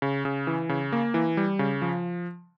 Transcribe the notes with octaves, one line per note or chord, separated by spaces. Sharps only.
C#3
C#3
E3
C#3
A#3
E3
G3
C#3
F3